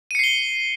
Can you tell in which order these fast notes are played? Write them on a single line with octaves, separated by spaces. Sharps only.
D#7 C#7 C7 G7